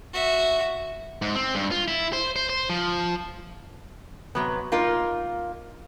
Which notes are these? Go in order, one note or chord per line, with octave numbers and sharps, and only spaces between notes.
F#4 E5
G#2
C4
G2
F4
E4
C5
C5
C5
F3
C3 F#3 B3
A#3 D#4 F4 A#4